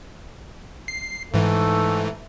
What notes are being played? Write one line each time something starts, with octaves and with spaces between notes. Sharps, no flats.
C7
G#2 E3 A3